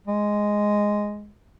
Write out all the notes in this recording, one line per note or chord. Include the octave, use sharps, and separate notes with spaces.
G#3